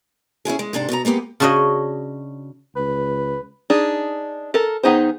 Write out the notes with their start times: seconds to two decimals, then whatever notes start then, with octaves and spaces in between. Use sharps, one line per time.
0.45 C#4 E4 F4 G#4
0.59 G#3
0.73 G#2 C3 D4 A4
0.89 B2 B3 B4 A#5
1.05 G#3 A#3 B3 G4
1.40 C#3 D4 F#4 C#5 D#5
2.76 C#2 B4
3.70 D4 D#4 G#4
4.54 A4 A#4
4.83 D#3 B3 D#4 G#4 C5